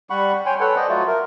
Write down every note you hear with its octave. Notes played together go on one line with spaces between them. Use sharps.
G3 F#5 B5 C#6
C#5 G5 G#5 C6
A4 B4 C#5 F#5
C5 D5 D#5
F#3 A3 F4 F#4
A#4